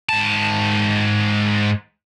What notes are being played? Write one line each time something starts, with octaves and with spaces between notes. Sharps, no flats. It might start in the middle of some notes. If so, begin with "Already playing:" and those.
G#2 A5